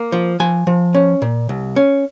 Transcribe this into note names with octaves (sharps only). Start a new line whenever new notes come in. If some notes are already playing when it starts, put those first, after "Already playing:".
Already playing: A#3
F3
F3 G#5
F3
C#4
A#2
C2
C#4